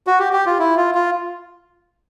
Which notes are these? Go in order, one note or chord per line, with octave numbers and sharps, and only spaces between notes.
F#4
G4
G4
F4
E4
F4
F4